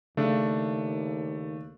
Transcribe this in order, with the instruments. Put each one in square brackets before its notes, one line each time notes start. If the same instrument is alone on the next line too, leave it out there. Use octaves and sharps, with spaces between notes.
[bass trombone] D#2 [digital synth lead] C#3 [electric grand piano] A3 D4